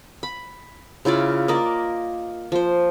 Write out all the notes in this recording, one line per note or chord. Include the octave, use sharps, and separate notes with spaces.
B5
C#3 E4 F4 D5
A#3 A#4 D5 D#5
F3 C5